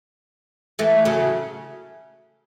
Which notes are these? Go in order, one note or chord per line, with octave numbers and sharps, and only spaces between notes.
E3 A3
C#3 F#3